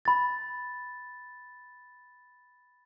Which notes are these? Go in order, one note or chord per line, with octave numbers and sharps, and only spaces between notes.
B5 A6